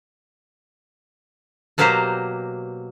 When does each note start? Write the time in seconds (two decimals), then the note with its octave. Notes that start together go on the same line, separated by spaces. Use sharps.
1.78 B2 F#3 A#3 G4 C5 A#5